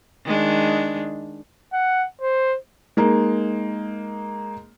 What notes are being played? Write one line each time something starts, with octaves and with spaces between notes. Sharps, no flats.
D#3 G#3 D4
F#5
C5
G#3 A#3 D#4